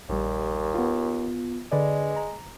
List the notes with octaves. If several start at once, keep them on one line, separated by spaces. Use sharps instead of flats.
A#1 D#2 G3
B3 F4
D3 G#3 B4 D5
A#5